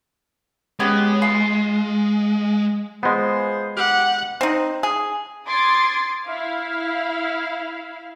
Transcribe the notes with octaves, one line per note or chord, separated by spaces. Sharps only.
G#3 B3 C#4 G4
F4
G#3 B3 F4 G#4 C5
G4 F#5
C4 D#4
G#4
C6 D6 D#6 G#6 A6 C7
E4 F5